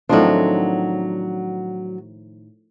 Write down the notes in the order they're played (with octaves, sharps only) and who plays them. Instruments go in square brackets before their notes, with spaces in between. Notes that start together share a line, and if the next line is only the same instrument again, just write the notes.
[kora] A2 D#3 F3 [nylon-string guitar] F#3 C4 D4